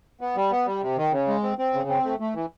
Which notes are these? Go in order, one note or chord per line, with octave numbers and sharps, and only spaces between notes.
B3
G3
B3
G3
C3
D#3
C#3
G#3
C4
C4
C#3
C4
A3
A3
E3